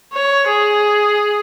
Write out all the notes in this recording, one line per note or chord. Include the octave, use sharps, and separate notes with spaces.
C#5
G#4